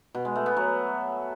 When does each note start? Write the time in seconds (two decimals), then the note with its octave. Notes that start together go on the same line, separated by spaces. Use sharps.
0.14 B2
0.25 G#3
0.36 A3
0.46 B3
0.57 F#3